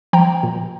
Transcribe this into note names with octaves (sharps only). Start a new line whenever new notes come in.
F3 G5 A#5
A#2